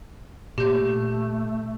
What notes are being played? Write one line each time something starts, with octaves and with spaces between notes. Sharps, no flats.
A#2 A3 G4 G6